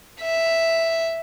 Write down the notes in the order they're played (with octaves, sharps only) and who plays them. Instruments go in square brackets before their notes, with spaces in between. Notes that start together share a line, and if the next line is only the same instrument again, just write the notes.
[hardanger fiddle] E5